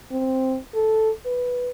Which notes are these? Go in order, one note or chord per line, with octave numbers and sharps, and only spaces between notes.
C4
A4
B4